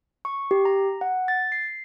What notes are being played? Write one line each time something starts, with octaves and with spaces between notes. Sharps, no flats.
C#6
G4
A#5
F#5
A6
C7